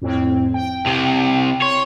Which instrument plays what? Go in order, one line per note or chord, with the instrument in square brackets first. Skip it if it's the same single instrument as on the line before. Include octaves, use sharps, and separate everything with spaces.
[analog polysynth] F2 A2 C4
G5
[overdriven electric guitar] C2 C3
[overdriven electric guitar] C#5 [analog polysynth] C6